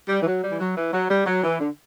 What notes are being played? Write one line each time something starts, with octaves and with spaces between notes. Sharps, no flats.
G3
E3
F#3
G3
E3
F#3
E3
F#3
G3
F#3
E3
D3